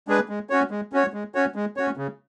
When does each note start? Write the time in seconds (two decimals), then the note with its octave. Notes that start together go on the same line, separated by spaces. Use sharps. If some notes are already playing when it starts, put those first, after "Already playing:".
0.08 G#3 D4 G#4 B4
0.29 G#3
0.50 C#4 F#4 C#5
0.71 G#3
0.93 C#4 F#4 C#5
1.14 G#3
1.35 C#4 F#4 C#5
1.55 G#3
1.77 C#4 F#4 C#5
1.97 C#3